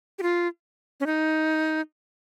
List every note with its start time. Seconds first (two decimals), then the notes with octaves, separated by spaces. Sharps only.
0.19 G4
0.23 F4
1.00 C#4
1.06 D#4